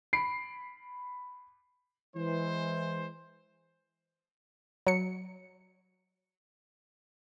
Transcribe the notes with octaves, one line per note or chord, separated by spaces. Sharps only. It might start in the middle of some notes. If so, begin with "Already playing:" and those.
B5 C7 D7
E3 G#3 C5
F#3 C#7